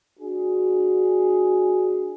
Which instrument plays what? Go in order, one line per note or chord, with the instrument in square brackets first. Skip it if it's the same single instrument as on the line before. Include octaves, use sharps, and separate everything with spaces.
[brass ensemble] D4 F#4 G#4